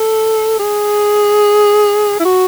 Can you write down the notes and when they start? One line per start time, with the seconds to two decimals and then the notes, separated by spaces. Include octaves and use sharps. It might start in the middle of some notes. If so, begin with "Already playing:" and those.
Already playing: A4
0.59 G#4
2.20 E4
2.25 F#4